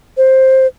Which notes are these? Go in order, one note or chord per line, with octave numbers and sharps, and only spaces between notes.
C5